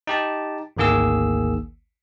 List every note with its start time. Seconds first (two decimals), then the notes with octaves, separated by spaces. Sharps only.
0.07 D#4 G4 A5
0.77 G#1 D2 D#3 A#3 G#4 E6